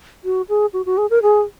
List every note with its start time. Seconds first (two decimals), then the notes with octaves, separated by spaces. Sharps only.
0.25 F#4
0.49 G#4
0.73 F#4
0.86 F#4
0.98 G#4
1.10 A#4
1.22 G#4